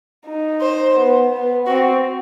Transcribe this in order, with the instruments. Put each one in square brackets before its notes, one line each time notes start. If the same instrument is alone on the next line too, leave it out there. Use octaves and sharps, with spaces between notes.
[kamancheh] D#4
[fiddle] C5
[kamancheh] B3
B3
[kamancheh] C4 [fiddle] F#4